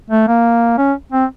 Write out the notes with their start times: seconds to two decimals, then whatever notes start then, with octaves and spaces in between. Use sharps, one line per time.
0.10 A3
0.27 A#3
0.78 C#4
1.12 C4